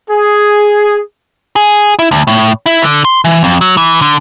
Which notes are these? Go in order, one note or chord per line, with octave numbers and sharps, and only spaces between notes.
G#4
G#4
E4
D2
A2
E4
D3
C6
E3
F2
F#3
E3
D3